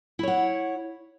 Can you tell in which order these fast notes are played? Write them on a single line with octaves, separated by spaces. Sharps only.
E4 C#5 F#5